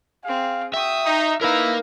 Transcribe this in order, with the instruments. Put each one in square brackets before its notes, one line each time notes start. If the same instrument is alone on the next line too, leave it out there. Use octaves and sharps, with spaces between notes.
[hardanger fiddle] C4 G#4 [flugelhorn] F5
[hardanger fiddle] F#4 D#6 [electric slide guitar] E5 [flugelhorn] G5
[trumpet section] D#4
[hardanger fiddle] D#4 [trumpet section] E4 [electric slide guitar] A#4 F5 [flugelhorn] B4